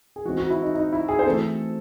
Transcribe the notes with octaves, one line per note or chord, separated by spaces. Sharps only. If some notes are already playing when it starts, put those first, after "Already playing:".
G#4
E3 G#3 C4 F#4
F#4
E4
D#4
D#4
E4
G#4
C5
E3 A3 C4 A4